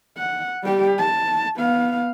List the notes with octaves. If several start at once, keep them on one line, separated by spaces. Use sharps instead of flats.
F#5
G3 G4
A5
B3 F5